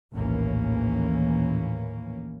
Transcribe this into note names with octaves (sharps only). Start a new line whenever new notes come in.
A#1 D#2 A2 E3 A#3 C#4